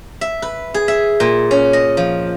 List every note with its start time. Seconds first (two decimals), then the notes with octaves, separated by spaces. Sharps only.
0.21 E5
0.42 B4
0.74 G#4
0.88 E5
1.20 A#2
1.51 C#4
1.73 D#5
1.97 F3